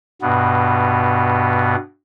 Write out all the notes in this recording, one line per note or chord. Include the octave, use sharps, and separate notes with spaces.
G2 B2 B3